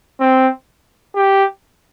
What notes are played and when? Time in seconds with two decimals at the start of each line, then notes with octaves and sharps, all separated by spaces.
0.20 C4
1.15 G4